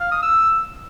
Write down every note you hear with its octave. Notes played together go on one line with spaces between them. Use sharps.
F5
D#6
E6